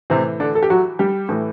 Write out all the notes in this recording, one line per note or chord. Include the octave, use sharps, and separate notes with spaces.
A2 C3 E3 C4
D3 D4
A4
G4
F#3 F#4
G3 G4
A2 E3